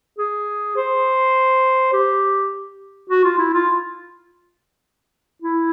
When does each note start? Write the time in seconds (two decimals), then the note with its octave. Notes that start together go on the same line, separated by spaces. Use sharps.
0.18 G#4
0.76 C5
1.93 G4
3.09 F#4
3.24 F4
3.38 E4
3.53 F4
5.42 E4